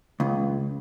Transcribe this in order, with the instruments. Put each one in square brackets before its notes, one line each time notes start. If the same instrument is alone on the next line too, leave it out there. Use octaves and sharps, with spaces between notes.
[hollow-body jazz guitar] C#2